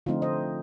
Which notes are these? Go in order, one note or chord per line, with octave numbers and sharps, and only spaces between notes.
D3 F3 A3 C4 D#4 F4
C5 D#5